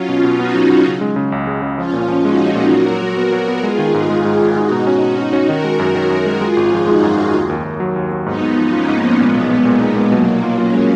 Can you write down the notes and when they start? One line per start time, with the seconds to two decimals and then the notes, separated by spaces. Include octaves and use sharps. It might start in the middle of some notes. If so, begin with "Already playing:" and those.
Already playing: F#3 C#4 F4
0.09 B2
0.24 B2
0.39 B3 D#4 F#4
0.55 F#3
0.70 F#3
0.85 C#3
1.01 G#3
1.16 C#3
1.32 C#2
1.47 G#3
1.62 C#3
1.77 F3 C#4 F4
1.93 A#2
2.08 F3
2.24 G#3 D#4 F#4
2.40 F3
2.55 A#2
2.70 F#3 F#4 A#4
2.86 F#3
3.02 F#3
3.17 B3
3.32 F#3
3.48 B3
3.63 G#3 F4 G#4
3.79 D#3
3.94 G#2
4.09 G#3
4.25 G#2
4.41 G#1
4.55 G#3 D#4 F#4
4.71 B2
4.87 C#4
5.02 B2
5.18 C#4
5.33 C#4
5.49 D#3 F#4 A#4
5.64 G#3
5.79 F#2
5.95 D#3
6.10 F#2
6.25 G#3
6.41 G#3 F4 G#4
6.57 G#1
6.72 F3
6.87 G#3 D#4 F#4
7.02 F#2
7.18 F#2
7.34 D#2
7.49 D#2
7.64 D#2
7.80 F#3
7.96 D#2
8.12 F#3
8.26 G#2 B3 D#4
8.42 G#2
8.57 F3
8.72 A#3 C#4 F4
8.88 G#2
9.04 F3
9.18 A#2 G#3 B3
9.35 B1
9.50 A#2
9.65 A#2
9.80 D#4
9.96 A#2
10.11 B2 F#3 A#3
10.27 B2
10.43 F4
10.58 A#3 C#4 F4
10.73 G#3